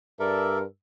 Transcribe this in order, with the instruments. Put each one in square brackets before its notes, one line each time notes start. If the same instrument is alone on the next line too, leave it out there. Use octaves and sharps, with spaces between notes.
[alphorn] G2 [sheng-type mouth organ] A4 D5 E5 [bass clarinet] A#4